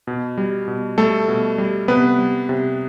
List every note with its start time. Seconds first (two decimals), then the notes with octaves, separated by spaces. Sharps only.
0.07 B2
0.38 G3
0.68 B2
0.97 G3 A3 A4
1.28 B2
1.58 G3
1.88 C3 B3 B4
2.18 G3
2.49 C3